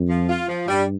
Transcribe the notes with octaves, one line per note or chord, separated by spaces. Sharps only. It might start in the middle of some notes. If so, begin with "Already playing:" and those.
Already playing: F2
F3
F4
F3
G2 G3